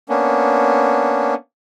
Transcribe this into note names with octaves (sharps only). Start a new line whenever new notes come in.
A#3 B3 C#4 D4